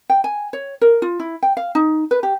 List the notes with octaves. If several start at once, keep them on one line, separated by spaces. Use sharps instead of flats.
G5
G#5
C#5
A#4
F4
E4
G5
F5
D#4
B4
G4